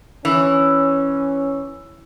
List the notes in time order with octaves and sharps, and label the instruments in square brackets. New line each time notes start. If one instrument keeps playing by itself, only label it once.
[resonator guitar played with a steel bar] E3 [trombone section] C#4